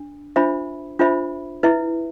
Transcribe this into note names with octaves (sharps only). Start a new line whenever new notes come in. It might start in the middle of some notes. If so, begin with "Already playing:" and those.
Already playing: D4
D4 F4 C5 E5 B5
D4 F4 C5 E5 B5
E4 B4 E5